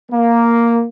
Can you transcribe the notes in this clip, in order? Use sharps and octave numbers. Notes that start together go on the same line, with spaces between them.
A#3